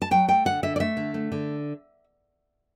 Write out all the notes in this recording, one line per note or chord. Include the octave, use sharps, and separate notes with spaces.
A5
F#3 G5
A3 G5
D3 F#5
D3 E5
D5
A3 E5
D3
A3
D3